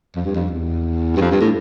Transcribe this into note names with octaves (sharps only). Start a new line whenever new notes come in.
F2
G2
F2
E2
G2
F2
G2
A2